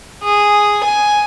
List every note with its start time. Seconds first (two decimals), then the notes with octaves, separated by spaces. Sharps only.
0.24 G#4
0.84 G#5